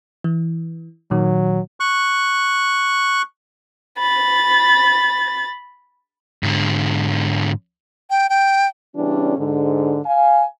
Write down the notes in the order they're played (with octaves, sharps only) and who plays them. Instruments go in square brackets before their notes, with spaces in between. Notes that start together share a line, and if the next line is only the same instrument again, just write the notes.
[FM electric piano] E3
[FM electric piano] A#2 D#3 [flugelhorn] F#3
[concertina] C#6 F#6
[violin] B5 A6
[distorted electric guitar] G#2 D3
[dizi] G5
G5
[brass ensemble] C#3 E3 G3 B3 C#4 D4
G#2 D3
F5 G#5